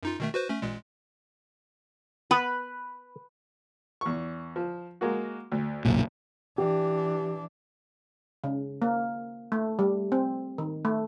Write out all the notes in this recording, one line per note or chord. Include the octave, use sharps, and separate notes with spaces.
F#2 D#4 F4
B2 D#3 A3
F#4 B4 C5
A3 C#4
A1 A#2 G#3
B3 B4
E2 C#6
F3
G#3 A#3 F#4
D2
F#1 B1 A#2
E3 D4 G4
C#3
A#3
A3
G3
C4
D#3
A3